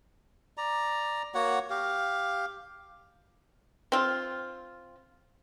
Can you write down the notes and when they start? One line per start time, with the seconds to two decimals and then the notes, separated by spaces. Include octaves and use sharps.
0.57 D5 A#5
1.35 A#3 F#4 C#5 F#5
1.70 G4 F5
3.92 C4 F4